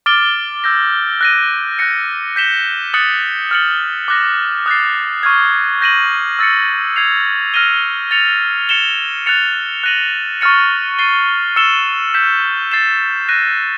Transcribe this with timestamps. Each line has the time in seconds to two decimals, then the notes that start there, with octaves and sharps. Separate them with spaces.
0.06 D6 F6 A6 D7 G7
0.64 E6 G6 A#6
1.21 F#6 A#6 D#7
1.79 F#6 A#6 C#7
2.36 G6 B6 E7 G7
2.94 D#6 F#6 A6 C#7 F#7
3.51 F6 A6 C#7 F#7
4.08 D6 F#6 A#6
4.66 D#6 F#6 A6 C7
5.23 C#6 F6 G#6
5.81 G6 A#6 D#7 F#7
6.39 E6 A6 C#7
6.96 G#6 C7 F7
7.54 F6 A#6 D#7 G7
8.11 A6 C#7 F7
8.69 A6 C#7 E7 G7
9.26 F#6 A6 C#7 F7
9.84 F#6 A#6 D#7 F#7
10.41 C#6 F6 A6 C#7
10.99 A6 C7 D#7 G7
11.56 E6 A6 C#7 E7 G7
12.14 G6 B6 E7
12.72 A6 C7 E7
13.29 F#6 A#6 D#7